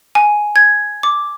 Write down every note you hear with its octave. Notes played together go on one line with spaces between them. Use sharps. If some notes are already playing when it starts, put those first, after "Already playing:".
G#5
G#6
D6